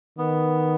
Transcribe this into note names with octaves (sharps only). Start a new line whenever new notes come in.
D#3 B3